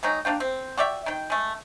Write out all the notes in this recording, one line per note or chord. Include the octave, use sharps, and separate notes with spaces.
D#3 F#3 G#3 D#4
A#3 D4 F4 G5
C4
F#4 G4 D5 E5
D#3 G5
G#3 A3